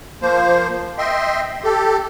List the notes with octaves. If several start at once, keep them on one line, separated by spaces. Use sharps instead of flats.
F3 A#3 C5
D#5 E5 G5 C6
G4 A4